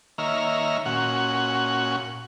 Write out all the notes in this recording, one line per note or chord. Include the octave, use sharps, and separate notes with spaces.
D#3 A#3 C#5 E5 A#5 F6
A#2 C#4 F#4 F#5